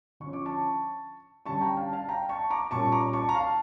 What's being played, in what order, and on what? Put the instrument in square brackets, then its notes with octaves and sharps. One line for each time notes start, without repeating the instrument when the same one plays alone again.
[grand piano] D3 F3 C#4 C#6
D6
A5 C#6
D3 G3 C#4 A5 C#6
G5 A#5
F5 A5
F5 A5
G5 A#5
A5 C#6
A#5 D6
A#2 G3 C#4 A5 C#6
A#5 D6
A5 C#6
A#5
F5 A5